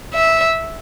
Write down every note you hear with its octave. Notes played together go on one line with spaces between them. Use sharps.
E5